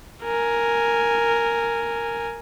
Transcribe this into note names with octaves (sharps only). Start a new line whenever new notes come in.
A#4 G#5